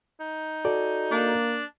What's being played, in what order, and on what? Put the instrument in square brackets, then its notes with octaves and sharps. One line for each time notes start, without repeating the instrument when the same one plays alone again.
[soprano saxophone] D#4
[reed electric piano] F#4 A4 D5
[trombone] A#3 [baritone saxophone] D4